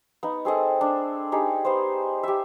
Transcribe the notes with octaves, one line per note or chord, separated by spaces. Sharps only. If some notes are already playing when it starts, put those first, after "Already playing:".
B3 D#4
C4 G#4 A4 D#5
D4
D#4 G4 G#4
B3 C5
G4 E5